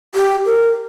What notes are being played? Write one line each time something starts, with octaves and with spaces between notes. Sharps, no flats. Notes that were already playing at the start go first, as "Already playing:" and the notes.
G4
A#4